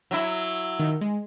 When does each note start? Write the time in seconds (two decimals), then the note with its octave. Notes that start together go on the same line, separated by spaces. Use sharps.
0.11 F#3 E4
0.79 D#3
1.01 G#3